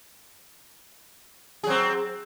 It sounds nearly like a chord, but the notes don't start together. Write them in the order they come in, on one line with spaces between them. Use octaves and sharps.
G#4 F#3 C4